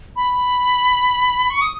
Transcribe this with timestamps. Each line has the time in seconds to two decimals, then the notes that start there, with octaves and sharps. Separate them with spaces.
0.16 B5
1.50 C#6
1.61 D#6